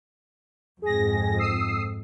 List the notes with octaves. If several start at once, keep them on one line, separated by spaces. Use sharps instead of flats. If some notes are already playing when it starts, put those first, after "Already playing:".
F2 G#2 G#4 A#6
D#6 E6 C7